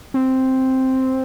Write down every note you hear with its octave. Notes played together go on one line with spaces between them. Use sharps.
C4